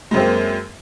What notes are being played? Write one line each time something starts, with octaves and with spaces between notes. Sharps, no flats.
F#2 G#3 A#3 C4